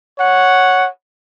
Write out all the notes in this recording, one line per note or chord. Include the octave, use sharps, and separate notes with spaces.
C#5 F#5